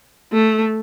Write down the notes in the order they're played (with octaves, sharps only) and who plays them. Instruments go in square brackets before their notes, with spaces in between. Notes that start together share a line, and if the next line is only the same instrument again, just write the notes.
[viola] A3